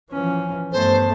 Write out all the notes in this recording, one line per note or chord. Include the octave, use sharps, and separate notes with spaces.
E3 F3 C#4
G2 A3 B3 C5 A5